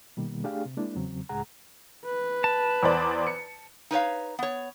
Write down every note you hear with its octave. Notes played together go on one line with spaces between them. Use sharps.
B2 D#3 G3 A#3
A3 D4 G4 G#4 F5
C3
G#3 A#3 D4 E4
E2 C#3 F#3 C4
C#2 A2 G#3 G#4 F#5 A#5
B4
A5
E2 C5 D5
C#7
D#4 B4 C#5 F5
B3 C#5